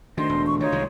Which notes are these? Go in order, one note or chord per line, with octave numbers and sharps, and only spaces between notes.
D2 D#3 C5 D#5 C6
E1
C#6
D#3 D#4 F4 C#5
C2 D#3 G#3